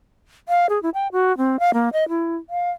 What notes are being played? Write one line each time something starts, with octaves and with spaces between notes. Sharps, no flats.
F5
G#4
E4
G5
F#4
C4
F5
A#3
D#5
E4
F5